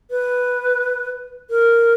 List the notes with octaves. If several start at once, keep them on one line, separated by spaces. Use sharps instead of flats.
B4
A#4